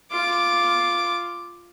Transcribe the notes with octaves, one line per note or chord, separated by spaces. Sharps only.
F4 D6